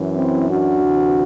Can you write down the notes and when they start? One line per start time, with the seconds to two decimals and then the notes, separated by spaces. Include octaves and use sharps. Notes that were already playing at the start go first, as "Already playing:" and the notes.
Already playing: F#2 E3
0.15 C4 E4
0.48 D4 F#4
0.82 D2 C3 E3